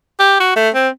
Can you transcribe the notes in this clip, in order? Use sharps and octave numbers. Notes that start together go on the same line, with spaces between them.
G4
F#4
A3
C4